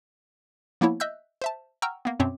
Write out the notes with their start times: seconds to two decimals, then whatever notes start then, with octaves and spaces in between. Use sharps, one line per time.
0.81 F3 A#3 B3 E4 C#5
1.00 D#5 E5 E6 F#6 G6
1.42 C5 E5 A5
1.82 F#5 G5 A#5 C#6 E6 F6
2.05 A#3 B3
2.20 F#2 B2 C4 C#5 E5 D6